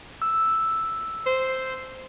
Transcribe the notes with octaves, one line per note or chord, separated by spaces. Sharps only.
E6
C5